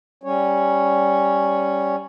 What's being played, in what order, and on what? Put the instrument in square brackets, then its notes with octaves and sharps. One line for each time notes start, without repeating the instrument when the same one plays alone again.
[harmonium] G3 C#4 C#5